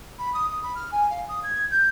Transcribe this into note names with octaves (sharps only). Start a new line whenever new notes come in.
B5
D#6
D#6
B5
F6
G#5
F5
D#6
G#6
G6